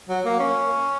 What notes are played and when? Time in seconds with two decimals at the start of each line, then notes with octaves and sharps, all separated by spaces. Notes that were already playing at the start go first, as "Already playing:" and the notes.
0.09 F#3
0.25 A#3
0.39 C#4